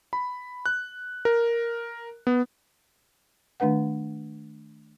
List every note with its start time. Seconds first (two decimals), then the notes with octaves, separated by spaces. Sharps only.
0.13 B5
0.66 F#6
1.25 A#4
2.27 B3
3.60 D#3 A3 D4 B4 F#5